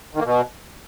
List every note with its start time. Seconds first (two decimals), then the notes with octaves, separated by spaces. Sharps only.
0.15 D#3
0.20 A#3
0.25 B2